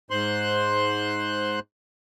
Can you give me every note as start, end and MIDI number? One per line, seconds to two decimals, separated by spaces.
0.11 1.60 44
0.11 1.60 72
0.11 1.60 84
0.11 1.60 90